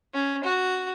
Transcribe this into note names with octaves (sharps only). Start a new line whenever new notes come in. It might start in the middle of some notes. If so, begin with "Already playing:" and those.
C#4
F#4